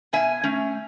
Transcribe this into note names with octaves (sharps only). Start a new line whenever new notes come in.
B2 E5 G#5
A3 C#4